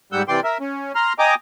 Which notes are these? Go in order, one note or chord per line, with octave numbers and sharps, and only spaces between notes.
G#2 G3 F#5 E6 G6
C3 E3 D5 G5 C6
A#4 E5
C#4
A#5 C6 F6
D#5 G5 G#5 A#5 D6